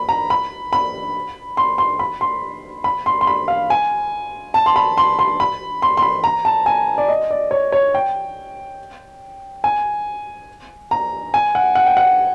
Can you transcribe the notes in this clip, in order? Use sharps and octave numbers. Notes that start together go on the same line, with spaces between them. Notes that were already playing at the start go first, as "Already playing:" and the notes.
Already playing: B5
A#5
B5
B5
C6
C6
B5
C6
B5
C6
C6
B5
F5
G#5
A5
C6
B5
C6
C6
B5
C6
C6
B5
A#5
A5
G#5
D5
D#5
D5
C#5
C#5
G5
G#5
A#5
G#5
F#5
F#5
G5
F#5